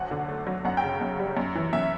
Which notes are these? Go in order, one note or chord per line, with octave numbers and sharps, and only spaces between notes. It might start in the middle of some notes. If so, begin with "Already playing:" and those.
Already playing: D2 F#3 F#5
D3
A3
F#3
F#2 F#5
G5
C#3
F#2
G3
F#2
E3
F#2 E5